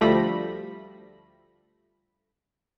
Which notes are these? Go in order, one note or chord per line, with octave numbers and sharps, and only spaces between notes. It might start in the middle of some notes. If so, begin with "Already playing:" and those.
D2 F3 G3 A3 B5 A#6